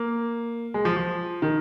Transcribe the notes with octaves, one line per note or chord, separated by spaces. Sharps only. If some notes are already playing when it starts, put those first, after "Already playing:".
Already playing: A#3
G#3
F3
F3
D#3